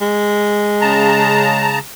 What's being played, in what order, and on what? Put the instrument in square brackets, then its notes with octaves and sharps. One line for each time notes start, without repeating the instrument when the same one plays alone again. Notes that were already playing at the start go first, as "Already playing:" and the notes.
[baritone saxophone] G#3
[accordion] C#3 A5 A#5